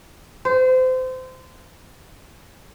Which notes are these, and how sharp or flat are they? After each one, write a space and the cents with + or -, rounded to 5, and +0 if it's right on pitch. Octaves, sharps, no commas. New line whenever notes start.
C5 -25